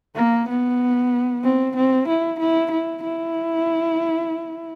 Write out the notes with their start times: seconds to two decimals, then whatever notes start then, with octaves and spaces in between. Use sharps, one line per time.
0.16 A#3
0.48 B3
1.44 C4
1.76 C4
2.08 E4
2.39 E4
2.71 E4
3.03 E4